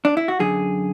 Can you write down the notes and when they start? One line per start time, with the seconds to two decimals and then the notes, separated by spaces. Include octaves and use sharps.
0.05 D4
0.17 E4
0.28 F#4
0.39 F#2 D3 G#4